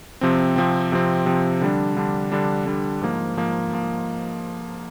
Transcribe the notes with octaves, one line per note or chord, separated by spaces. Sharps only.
C3 F3 C4
C3 F3 C4
C3 F3 C4
C3 F3 C4
D3 G3 D4
D3 G3 D4
D3 G3 D4
D3 G3 D4
G#2 F3 A#3
G#2 F3 A#3
F3 A#3